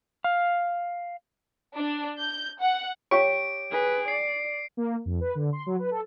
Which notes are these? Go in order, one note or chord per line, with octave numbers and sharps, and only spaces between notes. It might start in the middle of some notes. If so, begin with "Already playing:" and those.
F5
D4
G6
F#5
G4 C#5 F5 A#5 C#6 D7
G#4 B4
D5 C7
A#3
F2
B4
D3
C6
F#3
B4
A4